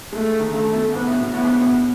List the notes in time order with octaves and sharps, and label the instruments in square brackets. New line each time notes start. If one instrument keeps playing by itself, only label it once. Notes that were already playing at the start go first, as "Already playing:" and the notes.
[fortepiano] G#3 [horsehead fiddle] A3
[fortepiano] D#3
[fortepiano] C#3 [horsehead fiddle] A3
[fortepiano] B2
[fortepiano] G#2 [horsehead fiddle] B3
[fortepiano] A2
B2
[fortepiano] A2 [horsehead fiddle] B3
[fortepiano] G#2
A2
B2